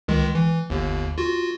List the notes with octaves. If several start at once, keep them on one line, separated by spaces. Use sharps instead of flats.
C#2 D#3 G#3
E3
G1 D#2
F4 F#4